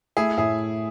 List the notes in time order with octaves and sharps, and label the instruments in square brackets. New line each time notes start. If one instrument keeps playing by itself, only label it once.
[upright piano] A3 [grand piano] E4 G#4
[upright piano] A2 [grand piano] E4 G#4